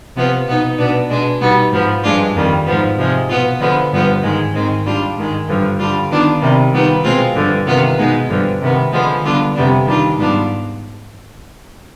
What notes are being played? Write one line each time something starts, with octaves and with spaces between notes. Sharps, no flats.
C3 F3 B3 F4
B2 B3 D#4
B2 B3 D4
B2 G#3 D4
B2 G3 B3 D#4
G#2 F3 B3
G2 F3 G#3 D4 F4
F2 D#3 G3
G#2 F3 B3
C3 F3 G#3
B2 B3 F4
D3 F3 G#3 B3
G2 D3 F3 B3 F4
G#2 D#3 G#3
G#2 D#3 G#3 C4
G#2 G3 D4 F4
G#2 D#3 G#3
G2 D3 F3
D3 G3 D4 F4
D#3 B3 D4 F4
C3 D#3 G3
D#3 G3 B3 F4
B2 G#3 C4 F4
G2 D3 F3
C3 D#3 B3 F4
B2 G#3 B3 D#4
G2 D3 F3
C3 D#3 B3
D3 F3 G#3 B3
D3 G3 B3 D4 F4
F2 C3 G3 B3 D4
D#3 G3 D4 F4
G#2 G3 B3 D4 F4